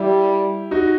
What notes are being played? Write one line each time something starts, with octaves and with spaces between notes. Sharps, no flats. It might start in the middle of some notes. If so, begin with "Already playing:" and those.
Already playing: G3 E4 G4
D#4 F#4